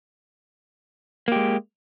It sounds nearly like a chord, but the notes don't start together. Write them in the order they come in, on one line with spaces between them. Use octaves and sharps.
A#3 G4 G#3